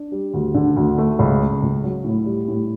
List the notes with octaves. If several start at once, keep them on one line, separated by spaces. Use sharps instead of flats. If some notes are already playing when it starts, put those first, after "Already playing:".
Already playing: D4
G3
D2
D3
D2
A3
C#2
C#3
C#2
F#3
A2
G3
A2